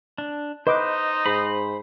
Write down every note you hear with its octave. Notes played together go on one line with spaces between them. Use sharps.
D4
D#4 B4 C5 D#5 D6
G#2 C5 B5